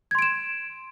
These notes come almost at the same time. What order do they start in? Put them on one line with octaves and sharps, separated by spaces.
G#6 C6 D7 E7